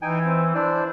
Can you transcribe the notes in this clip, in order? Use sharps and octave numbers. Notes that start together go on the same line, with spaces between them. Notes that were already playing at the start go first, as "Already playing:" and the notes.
E3 D#4 G5 G#5
C4
D4 E4 C5 D5